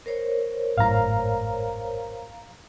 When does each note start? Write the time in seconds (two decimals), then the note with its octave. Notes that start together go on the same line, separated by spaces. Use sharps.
0.06 A#4 C5 C#5
0.78 G#1 F#2 A2 F5 A#5